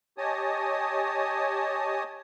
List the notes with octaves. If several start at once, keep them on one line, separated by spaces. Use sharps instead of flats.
G4 C#5 D#5 G#5 A5 D#6